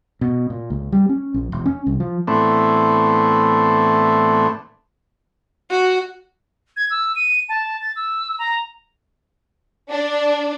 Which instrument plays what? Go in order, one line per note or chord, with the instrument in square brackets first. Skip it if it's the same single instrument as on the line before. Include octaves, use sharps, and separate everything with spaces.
[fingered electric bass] B2
A#2
C#2
G3
C#4
A#1
E1
C#4
C2
F3
[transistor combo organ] A2 E3 A3 B3 C4 D4
[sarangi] F#4
[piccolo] G#6
E6
D#7
A5
A6
E6
A#5
[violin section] D4